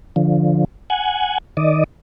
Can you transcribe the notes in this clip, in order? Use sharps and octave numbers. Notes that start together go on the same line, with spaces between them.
D3 F3
F#5 G#5
D#3 D5 D#5